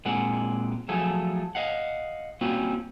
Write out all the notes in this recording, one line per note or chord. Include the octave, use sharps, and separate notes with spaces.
A#2 G#3 C4 F#5
F3 F#3 A3 G#4 A4
D#5 F5 F#5
G3 A#3 C4 C#4 F4 F#4